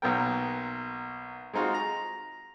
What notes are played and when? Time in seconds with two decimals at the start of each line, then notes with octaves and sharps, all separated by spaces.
0.02 B1 F#3 A#3 B3 A#4 G5
1.53 G#3 C4 D#4 F4 F#4
1.74 A#5